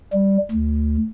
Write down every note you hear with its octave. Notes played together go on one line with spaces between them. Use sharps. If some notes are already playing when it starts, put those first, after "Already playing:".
G3
D2